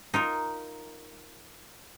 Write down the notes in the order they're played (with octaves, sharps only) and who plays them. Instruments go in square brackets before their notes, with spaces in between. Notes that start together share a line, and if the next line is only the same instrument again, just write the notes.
[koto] D#4 F4 A#4